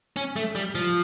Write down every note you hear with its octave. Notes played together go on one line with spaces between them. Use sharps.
C#4
A3
G3
F3